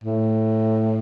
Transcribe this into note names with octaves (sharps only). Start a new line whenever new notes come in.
A2